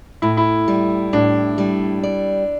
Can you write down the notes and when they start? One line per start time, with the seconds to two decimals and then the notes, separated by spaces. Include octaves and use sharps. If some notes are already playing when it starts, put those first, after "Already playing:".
0.22 A2 E4
0.37 E4
0.68 G3
1.13 A2 D4
1.58 G3
2.03 D5